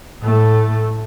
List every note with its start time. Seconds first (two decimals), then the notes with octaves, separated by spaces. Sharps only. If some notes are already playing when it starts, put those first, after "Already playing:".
0.22 A2 A3